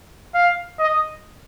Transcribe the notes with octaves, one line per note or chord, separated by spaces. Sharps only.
F5
D#5